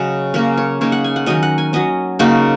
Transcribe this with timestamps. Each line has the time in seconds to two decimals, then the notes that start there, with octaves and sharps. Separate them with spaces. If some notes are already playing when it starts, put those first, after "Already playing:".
Already playing: C#3 F#3 C#4 G#4 D#5 F#5
0.34 C#3 A#3 C#4 A#4
0.57 C#5
0.81 C#3 A#3 D#4 C#5
0.92 F#5
1.04 G#5
1.16 F#5
1.26 D#3 F#3 C#4 D#5
1.43 F#5
1.58 G#5
1.73 F#3 C#4 D#5
2.19 C#3 A#3 D#4 F#4